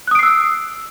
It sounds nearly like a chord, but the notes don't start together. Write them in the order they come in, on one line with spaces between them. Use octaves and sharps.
F#6 D#6 D7 C7 E6